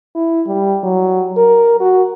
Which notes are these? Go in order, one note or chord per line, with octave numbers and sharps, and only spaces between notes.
E4
G3
F#3
A#4
F#4